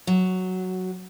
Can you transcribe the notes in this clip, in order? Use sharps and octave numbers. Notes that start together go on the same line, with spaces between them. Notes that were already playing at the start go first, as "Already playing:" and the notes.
F#3